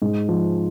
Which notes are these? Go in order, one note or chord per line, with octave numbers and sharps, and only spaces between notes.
G#2
F3